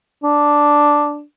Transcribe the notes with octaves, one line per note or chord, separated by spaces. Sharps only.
D4